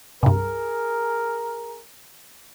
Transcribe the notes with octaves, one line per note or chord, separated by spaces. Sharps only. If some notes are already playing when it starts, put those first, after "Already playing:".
C2 G2 G#4 A#4